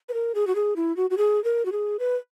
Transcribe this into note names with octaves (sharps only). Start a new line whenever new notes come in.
B4
A#4
G#4
F#4
G#4
E4
F#4
F#4
G#4
A#4
F#4
G#4
B4